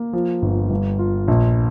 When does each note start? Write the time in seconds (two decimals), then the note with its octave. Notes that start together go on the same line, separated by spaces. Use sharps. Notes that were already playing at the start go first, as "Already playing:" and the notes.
Already playing: A#3
0.13 F3
0.42 G1
0.70 G2
0.99 F4
1.28 A#1